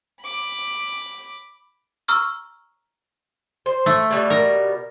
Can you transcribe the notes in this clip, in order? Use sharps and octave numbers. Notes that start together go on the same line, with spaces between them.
B5 D6
A#5 C#6 E6 F6
C5
A3
B2 G3
A#4